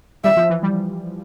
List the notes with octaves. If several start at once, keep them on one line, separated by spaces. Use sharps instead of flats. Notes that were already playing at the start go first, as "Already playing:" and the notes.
G3 E5
F3
E3
G3